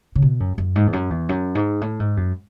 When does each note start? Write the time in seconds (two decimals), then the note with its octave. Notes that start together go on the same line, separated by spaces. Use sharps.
0.16 C#3
0.22 B2
0.40 F#2
0.58 F#2
0.76 G#2
0.87 E2
0.93 F#2
1.10 E2
1.29 F#2
1.55 G#2
1.81 A2
2.00 G#2
2.17 F#2